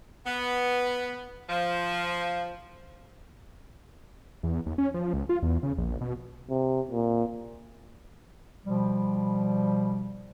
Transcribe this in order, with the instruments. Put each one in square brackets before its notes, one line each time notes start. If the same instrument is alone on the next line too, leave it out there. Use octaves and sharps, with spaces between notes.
[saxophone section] B3
F3
[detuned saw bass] E2
D#2
C#4
F3
C#2
F4
E2
C#3
A#1
B2
[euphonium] C3
A#2
[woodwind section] B2 F3 G3